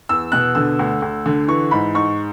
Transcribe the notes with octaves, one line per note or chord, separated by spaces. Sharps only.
E2 E6
B2 F#6
D3 E6
D2
D2
D3
E3 C#6
G#2 B5
G#2 C#6